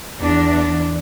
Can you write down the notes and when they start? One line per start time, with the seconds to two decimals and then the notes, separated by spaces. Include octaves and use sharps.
0.20 E2 D4